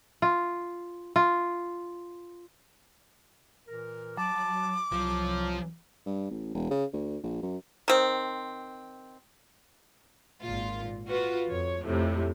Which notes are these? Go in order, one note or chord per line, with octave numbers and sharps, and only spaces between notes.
F4
F4
A#2 E3 A#4
F#3 A5 D6
C2 F3 F#3
G2
A1
E1
C#3
D2
A#1
F#2
D#3 C4
G#1 A#2 F4
F4 F#4 B4
F2 C#5
F2 A2 C3